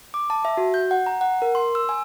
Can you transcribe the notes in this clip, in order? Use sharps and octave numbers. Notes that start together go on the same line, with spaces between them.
D6
A5
E5
F#4
G6
F#5
A#5
F#5
A#4
C6
E6
G#5